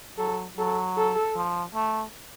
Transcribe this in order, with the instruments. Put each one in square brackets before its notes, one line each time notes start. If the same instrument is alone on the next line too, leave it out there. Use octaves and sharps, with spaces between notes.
[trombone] F#3 [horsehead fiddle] A4
[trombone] F#3 [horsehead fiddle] A4
[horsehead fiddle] A4
[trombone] F3
A3